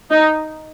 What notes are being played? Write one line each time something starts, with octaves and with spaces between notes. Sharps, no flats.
D#4